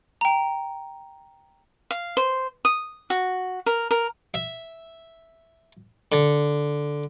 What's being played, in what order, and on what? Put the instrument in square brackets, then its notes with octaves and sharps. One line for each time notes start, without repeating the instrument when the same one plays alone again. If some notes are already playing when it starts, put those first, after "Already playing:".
[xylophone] G5 A#5
[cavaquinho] F5
C5
D#6
F#4
A#4
A#4
[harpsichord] E5
D3